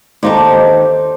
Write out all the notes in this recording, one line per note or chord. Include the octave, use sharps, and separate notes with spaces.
D#2 D#4 G4 A4 C5 D5